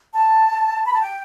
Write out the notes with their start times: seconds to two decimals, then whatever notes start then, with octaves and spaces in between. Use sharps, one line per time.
0.13 A5
0.86 B5
0.93 A5
1.00 G5